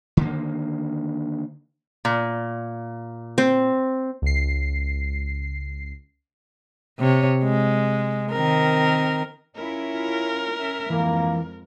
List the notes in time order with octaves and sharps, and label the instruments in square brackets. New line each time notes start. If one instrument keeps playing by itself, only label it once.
[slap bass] D3 D#3 A#3
[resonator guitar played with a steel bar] A#2
[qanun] C4
[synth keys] C#2 C7
[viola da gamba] C3 C#5
G#3
D#3 C4 A#4
[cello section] C#4 E4 F4 [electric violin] A#4
[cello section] C#4 E5
[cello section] F2 G#2 [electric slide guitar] E3 [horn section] A#3